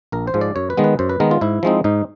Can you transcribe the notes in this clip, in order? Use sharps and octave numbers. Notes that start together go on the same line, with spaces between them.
A#1 A#4
C5
G#2 F3 G#3
D5
F#2 C#5
B4
D#3 G#3 B3
B4
F#2 C5
B4
D#3 G#3 B3 A#4
F4
G#2 E4
F3 G#3 C4 D#4
G#2 D#4